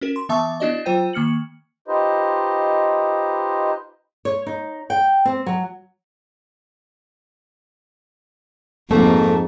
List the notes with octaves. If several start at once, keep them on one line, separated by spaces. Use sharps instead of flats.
C#4 F#4 A#4
C6
E3 B3 E5 A5 C#6 E6
B3 D4 E4 F#4 D5 D#5
F#3 F4 C5 G5 G6 D#7
D#3 A#3 F6 C#7 F#7
D#4 F4 G4 B4 C5 D#5
C#5
D#4
G5
C4
F#3
F2 G#2 A3 A#3